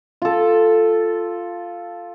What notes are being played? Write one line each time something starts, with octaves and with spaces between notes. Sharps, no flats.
F4 A4